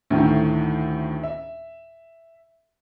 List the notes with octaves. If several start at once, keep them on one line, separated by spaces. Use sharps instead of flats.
D2 A2 D#3
E5